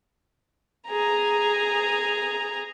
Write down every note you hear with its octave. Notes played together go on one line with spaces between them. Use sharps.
G#4 A#5